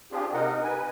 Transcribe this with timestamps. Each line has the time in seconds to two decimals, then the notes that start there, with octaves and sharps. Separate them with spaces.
0.12 C4 D4 F4 G4 G#4
0.33 C3 D#4 A#4 D#5 F#5
0.63 B4 G#5